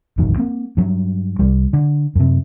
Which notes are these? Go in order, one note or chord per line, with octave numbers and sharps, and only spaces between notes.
E1 A1 F#2 D#3
A#3 C4
G2 F#3
C2 G3
D3
F#2 C3